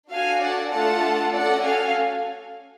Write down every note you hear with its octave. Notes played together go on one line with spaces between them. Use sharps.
D4 F#4 A4 F5 G#5
D5 F#5
A3 D4 F4 A4 F#5 A5
C#4 F#4 A4 D5 F#5
F5 G#5